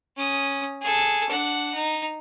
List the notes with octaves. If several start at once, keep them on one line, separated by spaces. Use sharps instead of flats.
C#4 D#6
G#4 A4
D4 F#5
D#4